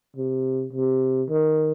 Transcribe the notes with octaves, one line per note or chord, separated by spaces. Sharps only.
C3
C3
D#3